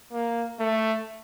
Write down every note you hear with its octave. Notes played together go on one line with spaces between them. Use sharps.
A#3
A3